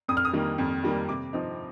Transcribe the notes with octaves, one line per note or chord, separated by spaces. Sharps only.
F2 D#6
F6
D#6
D#3 G3 A#3
F2
D#3 G3 A#3
C3 D6
F3 C4 D#4